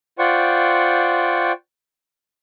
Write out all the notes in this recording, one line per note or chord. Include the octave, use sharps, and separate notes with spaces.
F4 C5 D5 F#5 G5 C#6